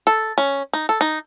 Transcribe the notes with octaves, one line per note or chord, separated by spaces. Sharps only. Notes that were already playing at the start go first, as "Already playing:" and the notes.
A4
C#4
D#4
A4
D#4